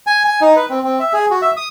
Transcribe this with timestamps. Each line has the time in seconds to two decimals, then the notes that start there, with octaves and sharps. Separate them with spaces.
0.07 G#5
0.25 G#5
0.41 D#4
0.56 B4
0.70 C4
0.84 C4
1.00 E5
1.13 G#4
1.31 F#4
1.42 E5
1.57 D#6